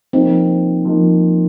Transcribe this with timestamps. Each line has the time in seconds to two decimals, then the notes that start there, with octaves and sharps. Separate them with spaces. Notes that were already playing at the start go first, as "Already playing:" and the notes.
0.13 F3 A#3 C4 D#4
0.85 F3 A#3 D#4